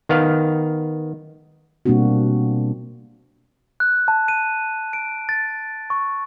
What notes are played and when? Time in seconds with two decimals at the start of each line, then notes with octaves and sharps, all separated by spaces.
0.09 D#3 B3 F5
1.86 B2 G3 A#3 C4 D4 F#4
3.80 F#6
4.08 A5
4.28 D#7
4.93 D7
5.29 A6
5.90 C#6